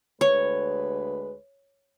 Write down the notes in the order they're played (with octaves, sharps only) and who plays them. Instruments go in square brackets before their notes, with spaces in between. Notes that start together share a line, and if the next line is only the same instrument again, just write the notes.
[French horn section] D2 G#3 B4 [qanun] C#5